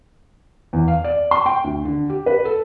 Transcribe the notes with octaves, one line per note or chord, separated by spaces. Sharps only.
E2
F5
D5
C6
G5
D2
D3
G4
B4
A4